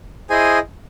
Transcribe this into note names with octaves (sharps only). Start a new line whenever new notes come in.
E4 G#4 C5 D#5 G#5